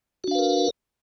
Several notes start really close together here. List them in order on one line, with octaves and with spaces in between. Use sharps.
F#4 D4 F5 B4 A#4